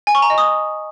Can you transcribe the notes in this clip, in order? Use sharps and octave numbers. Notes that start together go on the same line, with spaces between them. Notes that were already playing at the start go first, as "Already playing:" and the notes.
G#5
C#6
A#5
D#5
D#6